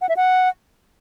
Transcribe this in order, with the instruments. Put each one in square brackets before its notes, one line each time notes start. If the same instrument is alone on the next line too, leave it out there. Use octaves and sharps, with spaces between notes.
[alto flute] F#5
E5
F#5